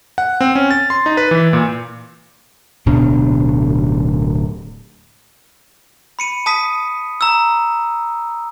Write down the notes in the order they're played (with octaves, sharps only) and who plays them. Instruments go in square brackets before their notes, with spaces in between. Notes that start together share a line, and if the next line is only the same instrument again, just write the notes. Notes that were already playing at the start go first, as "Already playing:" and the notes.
[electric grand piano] F#5
C4
C#4
A6
C6
D#4
B4
E3
A#2
[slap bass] D1 B2 D4
[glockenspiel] B5 C#7 D#7
A5 D#6 B6 D#7
A#5 E6